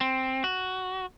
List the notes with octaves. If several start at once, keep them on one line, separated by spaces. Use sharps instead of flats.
C4
F#4